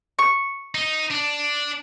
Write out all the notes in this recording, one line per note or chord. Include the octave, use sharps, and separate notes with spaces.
C#6
D#4
D4